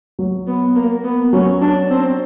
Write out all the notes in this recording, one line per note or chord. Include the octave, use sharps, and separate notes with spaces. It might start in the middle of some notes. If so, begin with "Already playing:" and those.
F#3
B3
A#3
B3
F#3 C#4
D4
C4